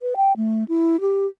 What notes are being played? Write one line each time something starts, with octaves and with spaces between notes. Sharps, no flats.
B4
G5
A3
E4
G4